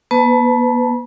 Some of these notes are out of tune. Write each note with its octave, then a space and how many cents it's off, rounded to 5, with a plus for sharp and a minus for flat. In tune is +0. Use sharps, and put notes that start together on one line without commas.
B3 -45 B4 +30 A5 +0